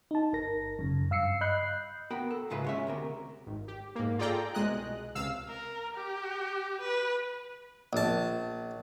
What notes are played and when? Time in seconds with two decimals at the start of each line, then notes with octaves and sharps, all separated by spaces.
0.11 D#4 A5
0.33 G1 A#4 A#6
0.79 F#2 C#3
1.10 G2 F5 E6 C7 C#7
1.41 D#5 B5 F#6 G6 C7
2.11 B3 F#4 A#4 G5 B5
2.31 A4
2.50 G#2 C#3 F4 B4 E5
2.64 G#3 C#4 E5
2.87 D2 C3 A#4
3.46 G#1
3.68 G4
3.95 G#2 A#3
4.19 F4 G#4 A4 D5 G5 A#5
4.54 C2 B2 G#3 D#5 F#6
5.15 C#2 C3 F5 E6
5.49 A#4
5.95 G4
6.80 B4
7.93 A#1 A5